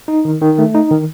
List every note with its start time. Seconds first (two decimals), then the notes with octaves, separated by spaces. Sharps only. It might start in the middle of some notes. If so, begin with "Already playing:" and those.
0.08 D#4
0.25 D#3
0.42 D#3
0.58 A3
0.75 D#4
0.91 D#3